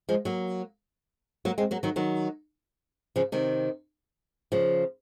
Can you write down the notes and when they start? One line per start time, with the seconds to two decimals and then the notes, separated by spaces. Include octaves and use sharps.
0.09 F3 G#3
0.25 F#3 A#3
1.45 F#3 A#3
1.58 G#3 C4
1.71 F#3 A#3
1.83 D#3 F#3
1.96 D#3 F#3
3.16 C#3 F3
3.32 C3 D#3
4.52 C#3 F3